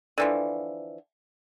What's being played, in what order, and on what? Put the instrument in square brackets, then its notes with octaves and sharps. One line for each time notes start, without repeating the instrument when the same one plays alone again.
[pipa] D3 E3 F3